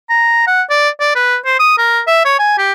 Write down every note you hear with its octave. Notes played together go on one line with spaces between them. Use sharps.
A#5
F#5
D5
D5
B4
C5
D#6
A#4
E5
C#5
G#5
G4